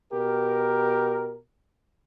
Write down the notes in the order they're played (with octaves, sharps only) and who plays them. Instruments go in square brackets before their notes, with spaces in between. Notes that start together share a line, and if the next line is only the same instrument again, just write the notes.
[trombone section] B2 G4 A#4